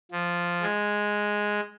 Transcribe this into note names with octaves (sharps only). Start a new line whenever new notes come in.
F3
G#3